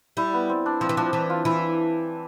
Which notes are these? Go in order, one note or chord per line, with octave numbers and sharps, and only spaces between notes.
G3 E4
B3
C4
D4
F3 C4
E3
F3 D4
E3
F4
E3 E4